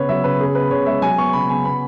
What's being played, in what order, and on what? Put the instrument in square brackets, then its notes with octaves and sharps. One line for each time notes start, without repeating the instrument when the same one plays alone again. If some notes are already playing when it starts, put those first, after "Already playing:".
Already playing: [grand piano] C#3 B3 B4 C#5
F#3 E5
C#3 B4
C#3 G#4
B3 B4
C#3 C#5
G#3 E5
F#3 G#5
B3 C#6
C#3 B5
C#3 G#5
B3 B5